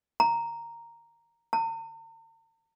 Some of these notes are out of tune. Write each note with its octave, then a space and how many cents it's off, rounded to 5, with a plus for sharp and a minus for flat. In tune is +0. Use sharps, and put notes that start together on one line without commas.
A#5 -5
A#5 -45